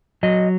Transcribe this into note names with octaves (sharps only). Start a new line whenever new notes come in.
F#3 D#5